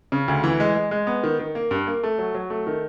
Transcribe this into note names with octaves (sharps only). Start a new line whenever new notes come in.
C#3
D2
E3
G#3
G#3
G#3
B3
D#3
D#3
A#3
G2
A#3
A3
F#3
F#3
A3
D#3